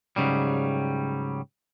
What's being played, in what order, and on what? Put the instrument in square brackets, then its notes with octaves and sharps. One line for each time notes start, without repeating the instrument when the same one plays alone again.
[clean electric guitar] G#2 C#3 F#3 G3